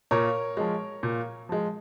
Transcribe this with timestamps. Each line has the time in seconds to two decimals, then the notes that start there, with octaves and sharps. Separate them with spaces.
0.11 A#2 A#4 C#5
0.57 F3 G#3
1.03 A#2
1.49 F3 G#3